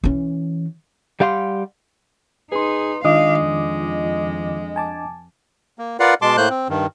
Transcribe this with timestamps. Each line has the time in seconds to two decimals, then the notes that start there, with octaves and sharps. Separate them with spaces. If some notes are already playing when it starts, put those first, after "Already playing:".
0.04 E3 C#4
1.20 G3 G4 F5 F#5 C6
2.52 D#4 G#4 B4 C6
3.05 D#3 G#3 D4 F4 D#5 F5 D6 D#6
3.43 F2
4.76 G#5 A5 D6
5.79 A#3
6.00 F4 A#4 B4 D5 F5 F#5
6.22 B2 G#3 A5 C6 D6
6.37 A2 A3 A#3 C5 F#6 G6
6.50 C4
6.69 G2 D#3